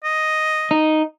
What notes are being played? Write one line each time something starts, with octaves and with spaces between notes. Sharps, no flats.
D#5
D#4